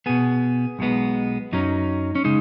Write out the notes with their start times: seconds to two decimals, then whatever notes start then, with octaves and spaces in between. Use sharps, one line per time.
0.06 B2 B3 G#4
0.79 B1 B2 G#3 B3
1.52 F#2 F#3 C#4 D#4
2.15 C#4
2.24 C#3 G#3 D#4